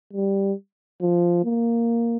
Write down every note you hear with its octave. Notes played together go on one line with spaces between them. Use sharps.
G3
F3
A#3